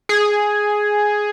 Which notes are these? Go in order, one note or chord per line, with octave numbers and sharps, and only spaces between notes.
G#4